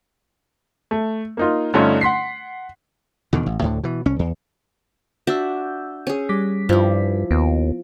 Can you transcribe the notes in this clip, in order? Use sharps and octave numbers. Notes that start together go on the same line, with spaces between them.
A3
A#3 D#4 F4
G2 D3 A3 C#4 D#4 F4
F#5 C6 B6 C7
E2 B2 D3 D#3
A1
D2 A2 D3
B2 E3
C2 C#4
E2
D4 F#4 E5 E6 G6
C#4 G#4
G3 D6 B6
G2 F3 E4
D#2 B3